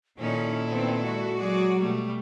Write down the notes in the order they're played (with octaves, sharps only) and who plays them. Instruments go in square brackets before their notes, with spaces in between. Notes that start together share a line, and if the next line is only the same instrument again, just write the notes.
[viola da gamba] A#2 E4 A4 [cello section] D#3 C#4 D#4 [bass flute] D5
[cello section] D#3 B3 C4
G#3 F#4
[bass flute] F#3 [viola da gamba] G#4 D5
[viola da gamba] B2 G3 A3